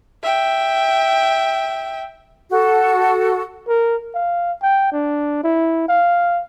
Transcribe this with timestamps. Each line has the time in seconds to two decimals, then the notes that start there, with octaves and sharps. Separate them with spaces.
0.23 E5 G5
2.50 F#4 A4
3.68 A#4
4.15 F5
4.62 G5
4.92 D4
5.43 E4
5.89 F5